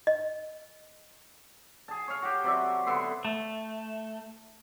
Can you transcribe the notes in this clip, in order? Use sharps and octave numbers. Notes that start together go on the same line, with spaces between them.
D#5
G#4 A5
C#5 F5
F#4 G4
C3 F#3 D5 E5
D3 B3 E5 C6
A3